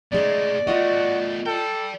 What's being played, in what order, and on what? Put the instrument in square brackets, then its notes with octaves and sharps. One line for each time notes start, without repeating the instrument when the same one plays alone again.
[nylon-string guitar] G#3 C#4 [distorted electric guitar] A3 D#4 [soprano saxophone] D5
[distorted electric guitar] A3 B3 [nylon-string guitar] F4 D#5 [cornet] F#4
[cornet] A4 [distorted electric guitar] D5 G5